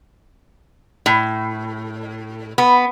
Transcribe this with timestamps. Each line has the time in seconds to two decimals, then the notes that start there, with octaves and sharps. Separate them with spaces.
1.06 A2
2.58 B3